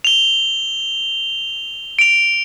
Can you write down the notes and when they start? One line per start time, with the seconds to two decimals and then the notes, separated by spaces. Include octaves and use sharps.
0.04 F7 G7
1.99 D7 F7